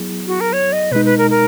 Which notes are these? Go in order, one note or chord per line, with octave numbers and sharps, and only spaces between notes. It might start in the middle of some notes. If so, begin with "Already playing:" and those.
Already playing: F#3 B3 E4 G#4
F#4
A#4
C#5
D#5
B2 G#3 D#4 B4
B4
A#4
A#4